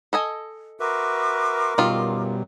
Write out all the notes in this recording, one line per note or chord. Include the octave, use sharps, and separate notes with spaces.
A4 D#5 G#5
F#4 A#4 B4 E5 C6 D6
F#2 B2 D#3 F#3 G3 F4